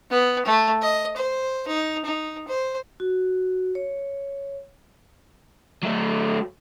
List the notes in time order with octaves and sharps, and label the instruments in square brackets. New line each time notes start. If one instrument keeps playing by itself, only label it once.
[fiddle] B3
A3
D#5
C5
D#4
D#4
C5
[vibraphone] F#4
C#5
[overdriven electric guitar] F#3 A3